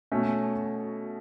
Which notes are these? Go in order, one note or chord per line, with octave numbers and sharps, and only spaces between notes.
B2 A3 C#4